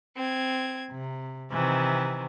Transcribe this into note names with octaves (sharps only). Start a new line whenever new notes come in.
C4 G#6
C3
C3 D#3 E3 C4